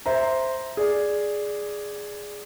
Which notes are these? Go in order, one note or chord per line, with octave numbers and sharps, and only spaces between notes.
C5 E5 A#5
G#4 D5